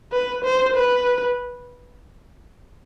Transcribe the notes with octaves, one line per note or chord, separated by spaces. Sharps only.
B4
C5
B4